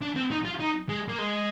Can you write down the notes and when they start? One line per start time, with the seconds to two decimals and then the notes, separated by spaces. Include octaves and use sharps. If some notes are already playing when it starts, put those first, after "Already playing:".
0.01 D4
0.16 C4
0.31 D#4
0.45 F4
0.60 D#4
0.89 G#3
1.08 A#3
1.18 G#3